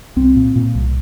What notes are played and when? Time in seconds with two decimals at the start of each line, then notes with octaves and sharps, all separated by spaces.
0.16 C2 C4
0.36 A#2
0.56 A#2
0.75 C2